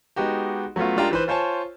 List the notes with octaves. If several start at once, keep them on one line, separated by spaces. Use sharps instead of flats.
G#3 B3 D#4 F#4 G4
F#3 A3 B3 C#4 F4
G#3 D4 F4 G4 A#4
E3 B4 C5
F4 C5 C#5 G#5 A5